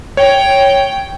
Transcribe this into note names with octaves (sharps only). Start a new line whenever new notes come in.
C#5 G5